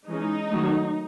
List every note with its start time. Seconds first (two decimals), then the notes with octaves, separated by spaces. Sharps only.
0.09 E3 G#3 C#4 D#4
0.50 D#3 F#3 A3